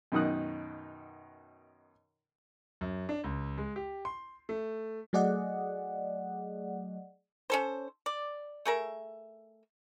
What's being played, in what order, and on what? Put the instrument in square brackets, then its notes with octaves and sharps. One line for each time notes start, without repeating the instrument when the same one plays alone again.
[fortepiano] F#2 B2 D#3 D#4 D#6 F#6
[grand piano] F#2
D4
C#2
G#3
G4
C6
A3
[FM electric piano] F#3 A3 G#4 D5 D#5 F#5
[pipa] C#4 A4 C5
D5
A3 G#4 A#4 E5